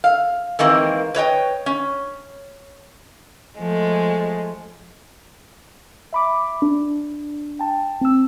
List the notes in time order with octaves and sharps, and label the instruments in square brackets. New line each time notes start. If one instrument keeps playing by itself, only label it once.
[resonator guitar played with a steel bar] F5
D#3 E3 G#3 A#3 C4
B4 C#5 D#5 G5
C#4
[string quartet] F3 G#3 A3
[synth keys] E5 B5 D6
D4
G5 A5
C4 E6